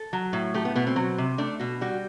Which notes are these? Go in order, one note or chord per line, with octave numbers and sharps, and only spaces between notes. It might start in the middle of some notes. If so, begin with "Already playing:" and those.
Already playing: A4
F#3
A2
A3 G4
B3
B2 B3
C4
F#3
C3
A3 D4
B2 F#4
G3 F#4